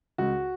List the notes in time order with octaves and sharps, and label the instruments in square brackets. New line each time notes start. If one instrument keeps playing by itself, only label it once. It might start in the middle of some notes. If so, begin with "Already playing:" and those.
[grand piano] C#2 F#4